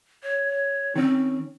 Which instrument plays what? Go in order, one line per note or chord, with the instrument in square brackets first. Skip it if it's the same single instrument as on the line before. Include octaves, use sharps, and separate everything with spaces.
[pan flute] C#5
[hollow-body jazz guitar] D#3 C#4 [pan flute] C4